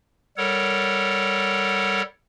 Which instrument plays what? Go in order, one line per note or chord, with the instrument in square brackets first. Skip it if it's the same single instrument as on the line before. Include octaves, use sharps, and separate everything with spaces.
[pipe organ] G3 A4 A#4 C#5 F#5